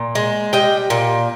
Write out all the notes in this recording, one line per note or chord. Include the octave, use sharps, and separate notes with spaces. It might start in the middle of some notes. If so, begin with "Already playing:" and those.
Already playing: A#2
G#3
G3 D#5 G5
A#2